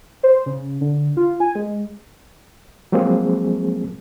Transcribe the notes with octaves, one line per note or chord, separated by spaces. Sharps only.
C5
C#3
D3
F4
G#5
G#3
F3 F#3 G#3 A#3 C4 G#4